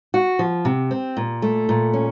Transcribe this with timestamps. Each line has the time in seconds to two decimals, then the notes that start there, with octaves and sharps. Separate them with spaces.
0.14 F#4
0.39 F3
0.65 C3
0.91 C4
1.17 A#2
1.42 A3
1.69 A#2
1.94 C#4